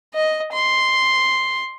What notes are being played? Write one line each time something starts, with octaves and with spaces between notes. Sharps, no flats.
D#5
C6